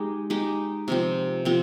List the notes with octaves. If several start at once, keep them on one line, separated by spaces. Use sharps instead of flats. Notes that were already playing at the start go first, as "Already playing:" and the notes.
Already playing: G#3 D#4 G4
G#3 D#4 G4
C3 F3 C4
C3 F3 C4